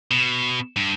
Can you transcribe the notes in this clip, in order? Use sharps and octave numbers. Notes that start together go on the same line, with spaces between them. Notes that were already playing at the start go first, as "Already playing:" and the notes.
B2
G2